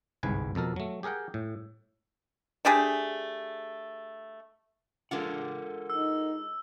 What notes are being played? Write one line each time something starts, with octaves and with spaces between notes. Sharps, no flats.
G1 C2 G#2 B4 G#5
F2 B2 A4 A#4
F#3 A3
G4 G#4 A#4 F#5 G5
A2
A3 D4 G4 G#4
G#3 D4 F4 A4 A#4 F#5
D#4 E6